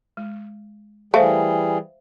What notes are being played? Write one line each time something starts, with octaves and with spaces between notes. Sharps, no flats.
G#3
E3 G3 A3 G#4 C5 E5 F5